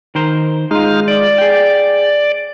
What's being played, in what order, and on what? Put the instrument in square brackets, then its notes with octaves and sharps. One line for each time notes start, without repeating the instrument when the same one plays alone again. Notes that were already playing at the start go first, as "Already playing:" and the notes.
[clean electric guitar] D#3 A#4 C5
[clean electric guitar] G#3 F4 [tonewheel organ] D#4 F6
[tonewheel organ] D5
[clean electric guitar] G#4 G5